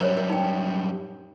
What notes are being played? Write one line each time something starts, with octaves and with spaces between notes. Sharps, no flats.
F#2 G3 A#4 C5 C#5
A#4
D#4 G5